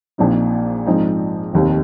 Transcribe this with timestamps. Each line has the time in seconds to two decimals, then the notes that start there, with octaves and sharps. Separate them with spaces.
0.18 A#1 A#2 F3 C4 D#4
0.86 G#2 F3 C4 D#4
1.53 F1 D#2 D#3 C4